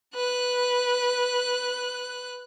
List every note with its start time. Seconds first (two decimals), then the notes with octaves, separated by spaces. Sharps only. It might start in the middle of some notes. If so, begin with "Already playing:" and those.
0.15 B4 F#6